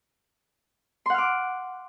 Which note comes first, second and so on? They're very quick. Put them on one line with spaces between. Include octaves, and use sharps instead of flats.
C6 F#5 F6 D6